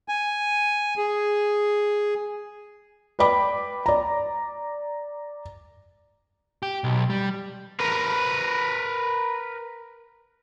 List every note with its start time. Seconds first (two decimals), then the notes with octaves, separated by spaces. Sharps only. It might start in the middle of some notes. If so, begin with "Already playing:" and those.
0.08 G#5
0.97 G#4
3.19 B4 D5 G5 B5 D6
3.86 D5 A#5
6.63 G4
6.84 B1
7.10 G3
7.80 A#4 B4